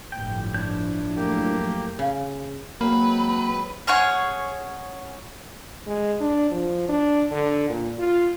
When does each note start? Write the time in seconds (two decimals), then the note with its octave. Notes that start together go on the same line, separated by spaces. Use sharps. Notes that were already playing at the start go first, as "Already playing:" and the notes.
0.12 G1 A2 F3 E4 G5
0.54 D4 C#5 G6
1.16 F#2 A3 A#3 G4
1.99 C#3
2.81 F#3 G#3 A#3 C4 B4
3.87 C#4 G#4 C#5 F#5
5.87 G#3
6.20 D4
6.51 F3
6.89 D4
7.31 D3
7.69 A#2
7.99 F4